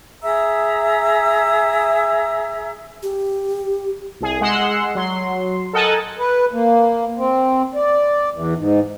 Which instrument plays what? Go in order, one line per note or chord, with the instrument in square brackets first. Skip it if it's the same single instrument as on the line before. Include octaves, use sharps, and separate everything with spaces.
[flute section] G#4 E5 A#5 E6
[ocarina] G4
[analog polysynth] C2 G#4
G#3 F#5 C6 E6
F#3 C6
A4 A#4 D#5 F#5 G#5 A5
[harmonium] B4
A#3
C4
D5
E2
G#2